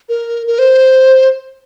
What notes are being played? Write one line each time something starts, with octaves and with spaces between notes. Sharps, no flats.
A#4
A#4
C5